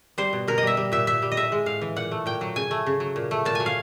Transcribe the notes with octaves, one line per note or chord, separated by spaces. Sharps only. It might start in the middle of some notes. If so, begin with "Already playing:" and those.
G3 C5
B2
B2 A#4
D#5
G3 E5
G3
A#2 E5
A#2 E5
G3
D#5
A2 E5
G#3
A2 F5
E3
A#2 F#5
A3
A#2 G5
F#3
C#3 G#5
A3
C#3
F#3
A#2
A3
A#2 A5
F#3 G#5
F5